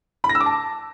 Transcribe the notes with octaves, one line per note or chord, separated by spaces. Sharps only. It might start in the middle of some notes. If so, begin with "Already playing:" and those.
B5
A#6
E6
D6
A5